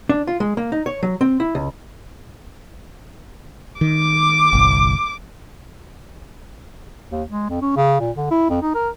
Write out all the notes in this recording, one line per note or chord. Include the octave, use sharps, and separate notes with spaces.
D4
F4
G#3
A#3
D#4
C#5
F#3
C4
E4
C#2
D#3 D6
G1 C2
D#2
G#3
F2
C#4
C#3
A#2
D3
E4
F2
D#4
A#4